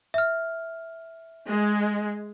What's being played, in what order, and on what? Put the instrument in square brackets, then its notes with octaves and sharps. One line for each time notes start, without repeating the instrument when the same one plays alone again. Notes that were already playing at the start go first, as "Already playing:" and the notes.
[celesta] E5 F6
[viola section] G#3